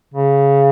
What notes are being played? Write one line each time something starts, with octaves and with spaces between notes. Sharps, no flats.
C#3